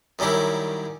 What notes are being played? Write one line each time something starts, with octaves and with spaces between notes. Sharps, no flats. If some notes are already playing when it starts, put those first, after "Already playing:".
F#2 D#3 G3 C#4 E4